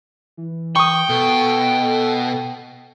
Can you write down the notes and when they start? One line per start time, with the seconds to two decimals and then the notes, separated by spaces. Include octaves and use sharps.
0.37 E3
0.75 G5 C#6 D#6
1.09 B2 A4